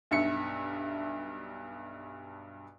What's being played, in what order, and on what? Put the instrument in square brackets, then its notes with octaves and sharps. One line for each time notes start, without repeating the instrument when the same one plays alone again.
[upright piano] B1 G2 E5 C#7